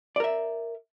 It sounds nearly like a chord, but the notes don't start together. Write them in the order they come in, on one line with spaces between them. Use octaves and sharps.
D5 A#4 E5